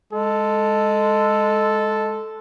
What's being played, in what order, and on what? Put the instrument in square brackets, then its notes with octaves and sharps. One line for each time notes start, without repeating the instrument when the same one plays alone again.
[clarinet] G#3 [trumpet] A4